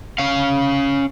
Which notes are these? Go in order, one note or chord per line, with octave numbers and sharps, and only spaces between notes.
C#4 F5